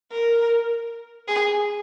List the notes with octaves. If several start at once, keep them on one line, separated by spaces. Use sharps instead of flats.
A#4
G#4